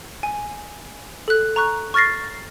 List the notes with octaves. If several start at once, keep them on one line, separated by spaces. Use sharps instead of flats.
G#5
A4 F#6
A#5 C#6 F#6
C#6 F6 A6 A#6 C7